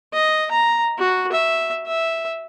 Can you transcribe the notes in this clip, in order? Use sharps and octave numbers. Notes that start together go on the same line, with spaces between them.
D#5
A#5
F#4
E5
E5